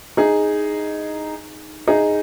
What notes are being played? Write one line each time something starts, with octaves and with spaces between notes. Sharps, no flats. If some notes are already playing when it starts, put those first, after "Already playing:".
D#4 G#4
D#4 G#4